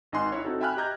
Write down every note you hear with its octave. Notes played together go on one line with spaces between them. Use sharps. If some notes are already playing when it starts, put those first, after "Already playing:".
G#1 D#4 D#5 G#5 C6 F#6
D#4 E4 C#5
C4 D#4 F#4 A4
E5 G5 G#5 B5 F6 F#6
G4 D#5 A#5 G6 G#6